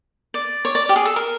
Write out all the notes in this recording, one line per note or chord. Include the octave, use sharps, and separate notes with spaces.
D5
C#5
D5
G4
G#4
A4
A#4